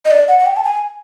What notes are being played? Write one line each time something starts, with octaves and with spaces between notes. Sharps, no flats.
D#5
D5
F#5
F#5
G5
A5
G#5